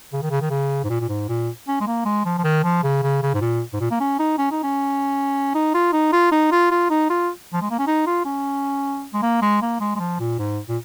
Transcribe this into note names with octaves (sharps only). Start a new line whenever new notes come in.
C#3
D#3
C#3
D#3
C#3
G#2
A#2
A#2
G#2
A#2
C#4
G#3
A#3
G#3
F3
F3
D#3
F3
C#3
C#3
C#3
G#2
A#2
G#2
A#2
A#3
C#4
D#4
C#4
D#4
C#4
D#4
F4
D#4
F4
D#4
F4
F4
D#4
F4
F3
G#3
A#3
C#4
D#4
F4
C#4
G#3
A#3
G#3
A#3
G#3
G#3
F3
A#2
G#2
A#2